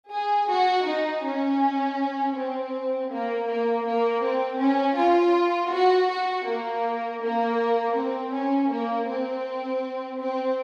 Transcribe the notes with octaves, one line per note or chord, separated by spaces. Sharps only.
G#4
F#4
D#4
C#4
C4
A#3
A#3
A#3
C4
C#4
F4
F#4
F#4
A#3
A#3
C4
C#4
A#3
C4
C4